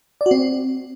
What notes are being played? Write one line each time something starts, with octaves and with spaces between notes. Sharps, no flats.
D5
F#4
C4